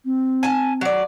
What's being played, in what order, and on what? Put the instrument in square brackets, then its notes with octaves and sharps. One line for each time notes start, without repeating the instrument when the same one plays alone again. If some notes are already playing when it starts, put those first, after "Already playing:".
[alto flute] C4
[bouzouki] G#5 A5
F#3 D5